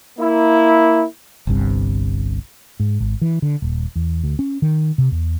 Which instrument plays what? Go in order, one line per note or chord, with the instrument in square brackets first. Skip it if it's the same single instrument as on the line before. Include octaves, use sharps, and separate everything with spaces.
[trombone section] A#3 E4
[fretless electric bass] G1 C2 G2 C3
G#2
G#1
E3
D3
D#1
E2
D2
C#4
D#3
C3
E2